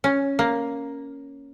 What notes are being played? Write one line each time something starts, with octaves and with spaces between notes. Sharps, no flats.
C#4
A#3